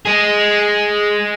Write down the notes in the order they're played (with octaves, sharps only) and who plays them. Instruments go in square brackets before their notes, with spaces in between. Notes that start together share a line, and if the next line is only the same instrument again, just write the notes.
[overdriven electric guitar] G#3 G#4